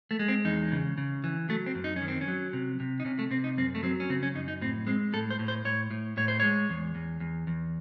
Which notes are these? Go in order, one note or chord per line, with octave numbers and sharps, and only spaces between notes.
A3
G#3
C4
E2 D#4
C#3
C#3
E3
F#3 A3
C4
F#2
D#4
C#4
D#3
C4
C#4
F#3
C3
C3
D#4
C3 C#4
A3
C3 C4
D#4
F#2 C4
A3
F#3 C4
C#4
C#3 C4
C#4
F#2 D#4
D#4
A2 C4
G#3 C4
A2 A4
C5
A2
C5
A2 C#5
A2
A2 C#5
C5
G#3 C#5
E2
E2
E2
E2